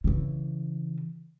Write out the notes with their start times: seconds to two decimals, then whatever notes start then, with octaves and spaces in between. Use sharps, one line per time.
0.04 C#3 E3